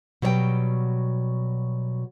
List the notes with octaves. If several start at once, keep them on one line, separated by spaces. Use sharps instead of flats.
B2 F#3 G3 C#5 F#5 G5